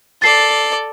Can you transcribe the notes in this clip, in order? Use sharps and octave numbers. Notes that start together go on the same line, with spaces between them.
A4 D5 A6 C7